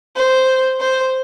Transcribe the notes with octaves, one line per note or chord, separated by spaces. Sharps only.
C5
C5